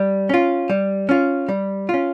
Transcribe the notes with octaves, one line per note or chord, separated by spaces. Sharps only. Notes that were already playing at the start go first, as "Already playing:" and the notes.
Already playing: G3
C#4 F4
G3
C#4 F4
G3
C#4 F4